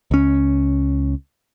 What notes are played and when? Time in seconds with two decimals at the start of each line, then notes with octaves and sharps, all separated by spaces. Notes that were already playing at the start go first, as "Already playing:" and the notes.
0.11 C#2 C#4